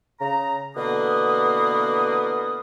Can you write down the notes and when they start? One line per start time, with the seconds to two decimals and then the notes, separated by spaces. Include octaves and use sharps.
0.20 C#3 A#5
0.76 B2 D3 E3 A#3 B3 D#6